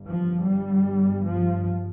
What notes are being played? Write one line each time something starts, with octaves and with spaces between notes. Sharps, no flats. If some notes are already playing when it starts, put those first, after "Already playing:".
Already playing: G1 G2
F3
G3
F3